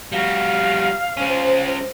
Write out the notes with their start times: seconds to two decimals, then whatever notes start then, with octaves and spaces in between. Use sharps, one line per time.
0.12 G3 F#4 F5
1.17 G#3 C#4 C5